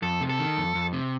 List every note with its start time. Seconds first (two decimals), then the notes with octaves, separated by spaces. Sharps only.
0.02 F2 A4
0.21 C3
0.29 A4
0.39 D#3
0.57 F2
0.75 F2
0.93 C3